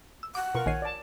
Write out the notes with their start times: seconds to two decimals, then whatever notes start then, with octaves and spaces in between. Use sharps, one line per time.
0.23 E6
0.35 F#5 D6
0.55 B2 F4 A#4 C#6
0.66 A#1 D#3 C#5 G#5 C7
0.82 D5 A5